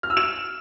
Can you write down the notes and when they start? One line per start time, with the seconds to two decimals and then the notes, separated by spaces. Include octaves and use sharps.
0.03 F6
0.10 E6
0.17 E7